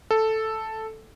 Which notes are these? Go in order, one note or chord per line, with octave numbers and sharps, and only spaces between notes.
A4